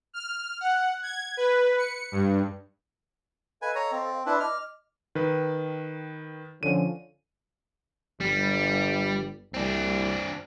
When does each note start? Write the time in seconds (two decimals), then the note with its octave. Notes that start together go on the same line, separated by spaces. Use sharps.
0.14 F6
0.61 F#5
1.03 G#6
1.37 B4
1.78 C#7
2.12 G2
3.62 A4 B4 D#5 F5 G#5
3.75 C#5 A#5
3.92 C4
4.26 D4 E4 B4 D5 C6
4.40 D#5 D6 F6
5.15 D#3 B4
6.63 D3 F3 C#4 D#7
8.21 G1 G3
9.54 C2 C4 D4